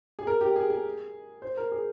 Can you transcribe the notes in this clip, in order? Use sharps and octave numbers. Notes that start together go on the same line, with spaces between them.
G#4
A#4
G4
G#4
G#4
C5
A#4
G#4